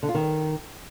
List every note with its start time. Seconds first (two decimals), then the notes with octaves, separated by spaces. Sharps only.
0.03 D3
0.09 F4
0.15 D#3